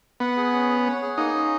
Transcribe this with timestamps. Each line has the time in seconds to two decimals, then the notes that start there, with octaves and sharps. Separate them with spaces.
0.20 B3 F#5
0.37 G#4
0.53 C#4
0.70 C#5
0.86 F#5
1.02 G#4
1.18 A#3 D#4
1.34 C#4